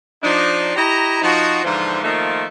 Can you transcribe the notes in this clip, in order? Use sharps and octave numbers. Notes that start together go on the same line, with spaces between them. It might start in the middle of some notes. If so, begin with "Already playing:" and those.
F3 D4 D#4
E4 G4 D#5 A#5
F3 D#4 F#4
G#2 D3 E3 F3
D#3 F3 A3 A#3 F4